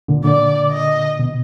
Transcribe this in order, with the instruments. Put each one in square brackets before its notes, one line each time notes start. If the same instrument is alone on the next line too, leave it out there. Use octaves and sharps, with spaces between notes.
[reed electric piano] A#2 D3
[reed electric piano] A#2 D3 [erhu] D5
[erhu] D#5
[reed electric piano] B2